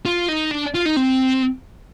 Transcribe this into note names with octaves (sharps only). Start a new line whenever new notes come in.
F4
D#4
D4
F4
D#4
C4